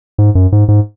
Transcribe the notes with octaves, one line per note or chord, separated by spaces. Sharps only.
G#2
F#2
G#2
G#2